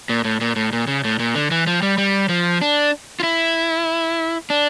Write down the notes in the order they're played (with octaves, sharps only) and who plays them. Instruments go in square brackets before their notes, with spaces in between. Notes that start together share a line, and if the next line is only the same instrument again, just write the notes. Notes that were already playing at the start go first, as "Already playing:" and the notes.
[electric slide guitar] A#2
A2
A#2
A2
A#2
C#3
A2
A#2
D3
E3
F3
G3
G3
F3
D4
F4
E4
D4